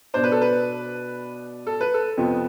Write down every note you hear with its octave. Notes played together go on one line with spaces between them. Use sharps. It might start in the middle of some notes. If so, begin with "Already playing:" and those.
B2 B3 D4 C5
B4
A4
B4
A4
B4
A4
F2 C3 F3 B3